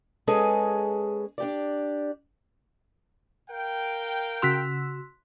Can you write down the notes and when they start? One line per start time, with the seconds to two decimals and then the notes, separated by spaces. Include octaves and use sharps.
0.27 G#3 C#4 G#4 A4 B4 D#5
1.38 D4 G4 D5
3.50 A#4 F5 G5
4.42 C#3 F#4 C6 E6 F#6 B6